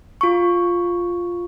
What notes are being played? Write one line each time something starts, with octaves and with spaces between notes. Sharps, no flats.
F4 C#6